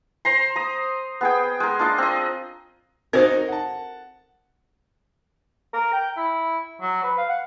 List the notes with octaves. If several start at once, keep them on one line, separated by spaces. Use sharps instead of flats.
C5 A#5 C6
A#5 D#6
B3 G#4 G5
G#3 A#4
D4 F4 D#5 F5
C4 D#5
C4 D#4 F#4 A#4 C5 D#5
F#5 A5
A#4
G5
E4
F#3
B4
F5
F#5